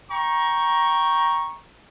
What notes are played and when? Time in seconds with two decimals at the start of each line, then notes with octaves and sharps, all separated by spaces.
0.10 G5 A#5 C#6